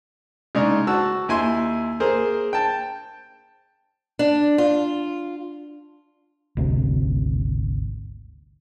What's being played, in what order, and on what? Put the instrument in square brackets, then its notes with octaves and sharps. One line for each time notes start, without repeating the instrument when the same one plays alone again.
[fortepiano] C#3 G#3 D4 D#4
F#4 A5 E6
D#2 E4 G#5 C6
A#3 G#4 A#4 C5
G5 A5
[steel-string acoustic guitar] D4
F4
[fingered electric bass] G#1 D2 C3